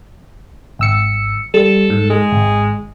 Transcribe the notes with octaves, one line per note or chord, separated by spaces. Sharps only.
G#1 E6 C#7
G3 A4
G#2
G#3
G#1